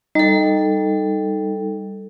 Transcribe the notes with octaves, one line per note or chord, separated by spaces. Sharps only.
G3 D#4 A4